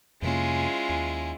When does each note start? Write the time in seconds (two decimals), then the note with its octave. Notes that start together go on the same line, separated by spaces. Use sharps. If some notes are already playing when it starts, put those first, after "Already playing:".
0.22 F2 C3 G#3 A#3 C#4 E4 F4
0.89 D#2